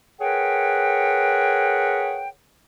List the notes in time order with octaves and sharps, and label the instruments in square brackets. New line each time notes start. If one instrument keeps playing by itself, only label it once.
[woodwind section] G#4 A#4 B4 C#5 F#5 G5